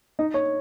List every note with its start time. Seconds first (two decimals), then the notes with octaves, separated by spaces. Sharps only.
0.19 D#4
0.34 C#5